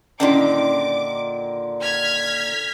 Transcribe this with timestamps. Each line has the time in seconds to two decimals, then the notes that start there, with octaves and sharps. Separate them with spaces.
0.20 A#2 D3 D#3 C#4 D4 E4 D6
1.82 F6 G#6 B6